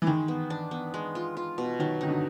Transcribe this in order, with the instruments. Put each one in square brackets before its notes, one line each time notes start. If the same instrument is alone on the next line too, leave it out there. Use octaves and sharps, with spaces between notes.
[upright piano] E3
[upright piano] D#3 [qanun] G#3
[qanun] B3
D4
B3
G#3
F4
F4
B2
[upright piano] D#3 [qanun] F#3
[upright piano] D#3 [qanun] D#4
[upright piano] D3